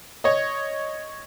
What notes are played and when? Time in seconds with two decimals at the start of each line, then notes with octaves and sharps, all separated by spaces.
0.24 C#5 D#5